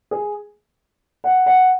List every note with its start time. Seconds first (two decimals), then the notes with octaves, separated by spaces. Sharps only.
0.11 G#4
1.24 F#5
1.46 F#5